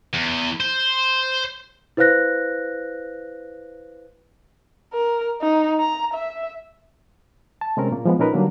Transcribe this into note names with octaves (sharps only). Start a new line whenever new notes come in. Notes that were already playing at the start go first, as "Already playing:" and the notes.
E2
C5
E4 B4 C5 F5 F#6 A#6
A#4
D#4
A#5
E5
A5
C3 G#3 C4 C#4 A#4
A#2 A#3
F3 G#3 B3
A#2 C#4 D#4 A#4 B4
D3 F#3 G3 A#3 D4